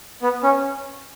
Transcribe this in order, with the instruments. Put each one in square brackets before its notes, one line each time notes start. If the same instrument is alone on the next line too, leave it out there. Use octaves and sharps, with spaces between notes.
[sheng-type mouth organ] B3
C#4